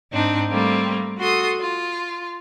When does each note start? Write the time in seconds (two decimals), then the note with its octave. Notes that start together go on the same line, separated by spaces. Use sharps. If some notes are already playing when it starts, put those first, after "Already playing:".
0.12 G#2 C4 D4 D#4
0.49 G3 A3 A#3 C4
1.19 F#4 A4 C6 D#6
1.61 F4